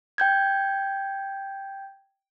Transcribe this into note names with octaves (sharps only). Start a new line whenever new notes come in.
G5 G6 G#6